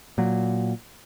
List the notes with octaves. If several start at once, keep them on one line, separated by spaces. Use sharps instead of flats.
A#2 F#3